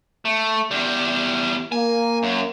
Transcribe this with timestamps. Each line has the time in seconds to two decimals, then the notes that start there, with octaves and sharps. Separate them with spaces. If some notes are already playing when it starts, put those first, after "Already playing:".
0.25 A3
0.71 E2 G3
1.72 A#3 G#5
2.23 F#2